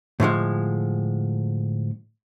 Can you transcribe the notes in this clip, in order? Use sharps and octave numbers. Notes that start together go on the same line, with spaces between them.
A2 D3 F3 G#3